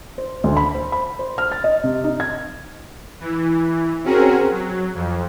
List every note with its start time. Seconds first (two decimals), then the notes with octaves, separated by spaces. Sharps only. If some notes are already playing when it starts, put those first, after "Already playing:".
0.18 C5
0.44 D2
0.57 B5
0.75 C5
0.92 B5
1.19 C5
1.38 F6
1.52 A6
1.64 D#5
1.84 C3
2.04 D#4
2.20 G#6
3.20 E3
4.04 C4 C#4 F#4 G#4 A#4
4.51 F#3
4.94 F2